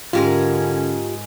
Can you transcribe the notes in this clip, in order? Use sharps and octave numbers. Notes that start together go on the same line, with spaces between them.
G#2 D3 G#3 C#4 F4 G4 A#4